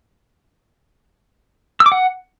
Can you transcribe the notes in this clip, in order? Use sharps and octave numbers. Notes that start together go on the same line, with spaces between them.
E6
D6
F#5